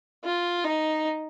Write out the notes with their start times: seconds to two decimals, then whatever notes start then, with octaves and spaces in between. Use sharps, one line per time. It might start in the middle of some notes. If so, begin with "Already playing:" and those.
0.25 F4
0.64 D#4